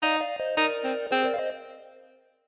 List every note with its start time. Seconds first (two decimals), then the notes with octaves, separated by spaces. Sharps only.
0.02 D#4 D5 F5
0.20 D5 F5
0.40 C5 D#5
0.57 D#4 A#4 D5
0.84 C4
1.11 C4 G#4 C5
1.24 A#4 D5
1.34 F5
1.38 C5 D#5